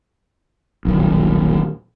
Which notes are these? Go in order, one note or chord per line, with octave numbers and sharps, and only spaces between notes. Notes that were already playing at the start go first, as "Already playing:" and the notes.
D#1 B1